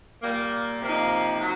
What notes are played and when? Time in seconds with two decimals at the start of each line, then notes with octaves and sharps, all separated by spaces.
0.23 A#2 G3 A#3
0.81 C3 F3 A#3 D#4
1.40 F#3